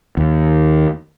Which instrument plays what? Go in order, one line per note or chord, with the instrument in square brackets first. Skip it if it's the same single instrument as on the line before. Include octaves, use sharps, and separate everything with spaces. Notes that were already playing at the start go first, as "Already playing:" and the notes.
[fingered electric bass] D#2